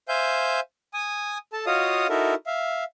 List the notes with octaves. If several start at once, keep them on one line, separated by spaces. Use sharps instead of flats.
C5 E5 F5 G#5 G6
G#5 D#6
A4 A5
F4 F#4 C#5 D#5 F5 D#6
D#4 E4 F#4 A4 A#4 E5
E5 F5